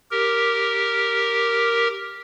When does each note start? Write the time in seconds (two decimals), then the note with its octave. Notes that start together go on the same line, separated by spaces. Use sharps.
0.11 G4 A#4